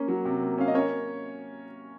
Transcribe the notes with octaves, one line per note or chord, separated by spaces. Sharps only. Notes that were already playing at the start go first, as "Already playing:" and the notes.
Already playing: A#3 C#4
F#3
C3
A#3
C#4 F5
D#5
C#4 A#4 C#5